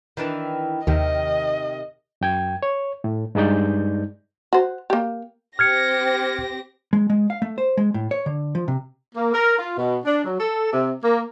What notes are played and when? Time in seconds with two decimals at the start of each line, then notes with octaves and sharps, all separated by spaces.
0.17 D#3 E3 D4
0.87 D#2 C3 D#3 D#5
2.21 F#2 G5 G#6
2.63 C#5
3.04 A2
3.35 G2 G#3 D#4 D5 G6
4.53 F#4 C5
4.90 A#3 G4
5.59 C4 G4 F6 G#6 A#6 C#7
6.93 G#3
7.10 G#3
7.30 F5
7.42 A3
7.58 C5
7.77 G#3
7.94 A2
8.11 C#5
8.26 D3
8.55 F3
8.68 C3
9.15 A#3
9.34 A#4
9.58 F4
9.77 B2
10.05 D4
10.24 F#3
10.40 A4
10.72 C3
11.03 A#3